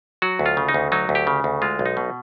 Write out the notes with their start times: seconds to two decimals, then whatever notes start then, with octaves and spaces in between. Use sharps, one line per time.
0.22 F#3 F#4
0.39 D2
0.46 F4
0.57 C#3
0.69 D#4
0.74 D2
0.92 F#3 D#4
1.09 D2
1.15 G4
1.27 C#3
1.44 D2
1.62 G#3 F4
1.79 B1
1.86 D#4
1.97 B2